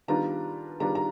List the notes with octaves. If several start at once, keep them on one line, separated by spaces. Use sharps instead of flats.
D#3 G3 B3 D4 F4 A#5
D#3 G3 B3 D4 F4 A#5
A#5